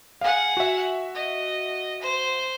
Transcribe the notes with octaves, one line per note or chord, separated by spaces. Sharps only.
G#4 F5 F#5
F#4 E5
D#5
C5